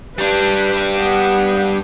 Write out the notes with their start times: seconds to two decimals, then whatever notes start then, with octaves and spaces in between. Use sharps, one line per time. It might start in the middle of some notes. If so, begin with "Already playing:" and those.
0.18 G3 D4 B4
0.97 B3